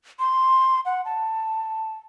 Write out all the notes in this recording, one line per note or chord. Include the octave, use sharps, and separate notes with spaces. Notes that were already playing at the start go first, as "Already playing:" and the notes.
C6
F#5
A5